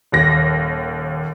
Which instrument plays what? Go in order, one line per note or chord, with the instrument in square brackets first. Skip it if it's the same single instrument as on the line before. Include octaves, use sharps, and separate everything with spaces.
[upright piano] D#1 D#2 A#6